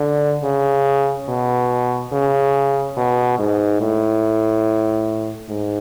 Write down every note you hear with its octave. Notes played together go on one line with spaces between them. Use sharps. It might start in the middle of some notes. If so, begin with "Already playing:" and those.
Already playing: D3
C#3
B2
C#3
B2
G#2
A2
G#2